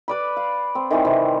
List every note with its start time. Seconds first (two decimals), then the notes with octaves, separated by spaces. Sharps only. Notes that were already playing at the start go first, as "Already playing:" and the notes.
0.08 B4 D5 B5
0.37 F5
0.75 C4
0.91 D#3 E3 G3 C4
1.05 C3